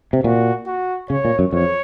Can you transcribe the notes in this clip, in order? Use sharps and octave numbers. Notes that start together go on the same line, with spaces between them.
C3
A#2 F#4
F#4
C#3 C#5
A#2
F#2
F2 C#5